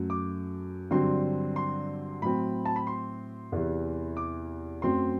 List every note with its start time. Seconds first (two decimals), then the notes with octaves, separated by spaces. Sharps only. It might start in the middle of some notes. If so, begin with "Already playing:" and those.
Already playing: F#2 F#3 A3
0.10 D6
0.91 G2 D3 F#3 C4 C6
1.56 C6
2.22 A2 F#3 C4 B5
2.66 A5
2.76 B5
2.87 C6
3.52 E2 C3 E3
4.17 D6
4.82 F#2 F#3 A3 C4 C6